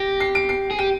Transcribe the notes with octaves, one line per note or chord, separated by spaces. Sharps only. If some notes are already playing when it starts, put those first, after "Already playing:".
Already playing: G4 A#6
C7
D7
C7
G#4
G4 D#7